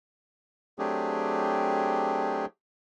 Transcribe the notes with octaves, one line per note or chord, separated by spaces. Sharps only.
F#3 A3 C4 D4 G4 G#4